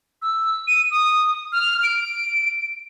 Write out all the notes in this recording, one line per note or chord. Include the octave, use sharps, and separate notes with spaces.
E6
D#7
D#6
F6
D7